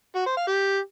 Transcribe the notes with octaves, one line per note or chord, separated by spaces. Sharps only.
F#4
C5
F5
G4